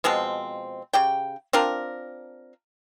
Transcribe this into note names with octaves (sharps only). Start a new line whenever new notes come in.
B2 F3 G#3 C4
C#3 G4 G5
C4 D4 F4 A#4